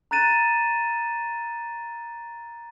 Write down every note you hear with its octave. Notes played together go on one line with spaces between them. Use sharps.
A#5 F#6 A6 D#7 E7